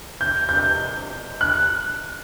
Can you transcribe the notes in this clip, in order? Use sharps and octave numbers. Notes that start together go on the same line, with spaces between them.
G6
G6
F#6